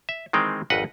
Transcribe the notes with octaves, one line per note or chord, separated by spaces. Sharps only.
E5
D#3 E3 G#3 C4 G5
G#1 F2 B4 D#5 F#5